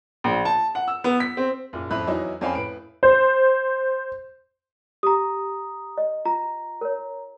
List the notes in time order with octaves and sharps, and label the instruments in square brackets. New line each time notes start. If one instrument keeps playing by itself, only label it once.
[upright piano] A#1
A5
F#5
E6
B3
B6
C4
F#1 A#2
F2 A2 E5 B5 F#6
E2 F#3 D#4 E4
F2 C4 C#4 F5 G#5 B5
A2 B4 D7
[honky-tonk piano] C5
[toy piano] G4 [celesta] A#5 D#6
[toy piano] D#5
[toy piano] F4 [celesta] A#5
[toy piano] A#4 C#5